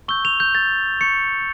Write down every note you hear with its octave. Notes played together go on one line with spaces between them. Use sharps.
C#6 E6 G6 G7
F7
G6
A6
C#6 G6 C#7